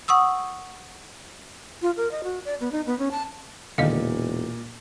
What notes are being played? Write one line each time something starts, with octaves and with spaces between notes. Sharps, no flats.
F#5 C#6 D#6 E6
F4
A#4
D#5
F#4
D5
B3
D#4
B3
C#4
A5
E1 A#2 D3 D#3 D#5 F5